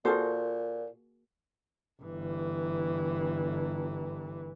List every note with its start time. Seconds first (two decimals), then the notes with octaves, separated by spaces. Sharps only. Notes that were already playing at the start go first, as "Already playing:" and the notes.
0.05 A#2 A#3 F4 F#4 G#4 A4 C5
2.03 G1 E3